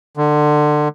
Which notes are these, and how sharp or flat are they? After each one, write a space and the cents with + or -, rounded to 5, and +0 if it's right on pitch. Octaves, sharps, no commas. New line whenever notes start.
D3 +25